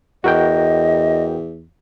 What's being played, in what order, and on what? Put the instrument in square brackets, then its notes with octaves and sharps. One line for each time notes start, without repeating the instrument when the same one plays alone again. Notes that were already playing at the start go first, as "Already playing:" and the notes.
[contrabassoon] E2 [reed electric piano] F#4 A#4 G5 [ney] D#5